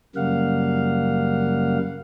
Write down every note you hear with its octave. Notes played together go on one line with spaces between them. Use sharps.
F#2 C#3 G3 A#3 F5 F#5